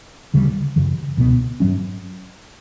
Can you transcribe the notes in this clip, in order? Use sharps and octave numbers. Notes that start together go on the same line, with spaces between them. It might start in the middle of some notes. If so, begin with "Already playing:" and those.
D2 C#3 G3
F#2 C#3 E3
C#2 B2 G3 B3
G2 F#3 C#4